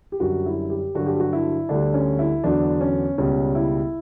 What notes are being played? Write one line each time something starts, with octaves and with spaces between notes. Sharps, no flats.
G4
F#2 D3 G3 F#4
E4
G4
G2 D3 F#3 F#4
G4
F#4
E4
D2 D3 G3 D4
C#4
E4
E2 D3 F#3 D4
C#4
C#2 B2 G3 C#4
E4